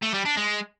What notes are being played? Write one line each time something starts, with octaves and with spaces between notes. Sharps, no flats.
A3
G3
D4
G#3